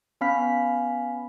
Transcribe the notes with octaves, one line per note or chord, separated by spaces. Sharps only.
B3 C#4 F5 B5 F6 B6